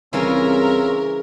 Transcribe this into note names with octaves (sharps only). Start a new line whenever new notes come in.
C2 C#3 E3 C#4 E4 F4 A#4 E6